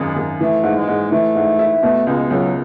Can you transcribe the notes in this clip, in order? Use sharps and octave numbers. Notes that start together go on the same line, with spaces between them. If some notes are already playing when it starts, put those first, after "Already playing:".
Already playing: G#1 F#2 G#3
G#1
E3 A3
G#2
G#3
G#2
E3 A3
G#2
E4
B2 A3
C#2 G#3
C#2 F#3